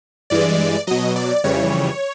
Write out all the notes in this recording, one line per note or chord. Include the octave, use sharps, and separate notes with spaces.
G2 E3 G#3 D5
B2 F#3 D#5
D5
F2 C#3 E3 G3 C#5